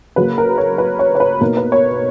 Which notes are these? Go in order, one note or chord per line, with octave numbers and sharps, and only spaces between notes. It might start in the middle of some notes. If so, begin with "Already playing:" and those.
C#3 F#3 A#3 B4
A#4
C#5
B4
C#5
C#5
B4
B2 A#3 D#4 A#4
B4
C#5